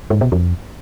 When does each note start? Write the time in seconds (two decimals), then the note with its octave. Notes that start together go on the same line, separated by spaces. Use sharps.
0.10 G#2
0.21 B2
0.32 F2